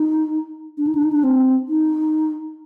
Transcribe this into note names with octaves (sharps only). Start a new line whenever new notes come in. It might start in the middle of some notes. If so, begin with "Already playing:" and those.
Already playing: D#4
D4
D#4
D4
D#4
D4
C4
D#4